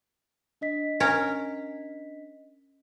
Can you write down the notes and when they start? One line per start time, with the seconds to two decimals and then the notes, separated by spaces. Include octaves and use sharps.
0.61 D4 D#5 B6
1.00 C#4 A#4